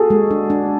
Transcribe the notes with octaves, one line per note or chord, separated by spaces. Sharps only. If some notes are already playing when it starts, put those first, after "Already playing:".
Already playing: F#4 G#4 A4
G#3
D4
D4